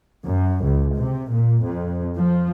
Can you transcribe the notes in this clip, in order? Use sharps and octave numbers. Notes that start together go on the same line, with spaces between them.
F#2
C#2
C3
A#2
F2
F3